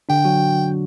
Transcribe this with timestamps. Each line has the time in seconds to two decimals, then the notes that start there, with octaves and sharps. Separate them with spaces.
0.09 D3 D4 G5
0.25 F#3 F#4